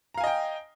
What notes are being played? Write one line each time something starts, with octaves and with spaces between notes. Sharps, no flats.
D#5 F5 G5 G#5 A#5